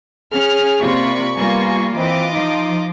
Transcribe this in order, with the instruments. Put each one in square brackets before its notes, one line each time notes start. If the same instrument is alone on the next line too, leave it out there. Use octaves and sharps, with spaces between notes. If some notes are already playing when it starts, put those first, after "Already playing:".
[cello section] C#4 [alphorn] G#4 [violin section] F6
[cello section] C3 A#3 F4 [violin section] D5 B5 C#6
[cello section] G3 A#3 F4 [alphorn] B3 [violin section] G#5 C#6
[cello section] E3 [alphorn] C4 [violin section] F4 D#5 D6
[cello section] F3 [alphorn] D#4